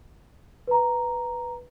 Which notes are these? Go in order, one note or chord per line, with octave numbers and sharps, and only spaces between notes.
B4 A#5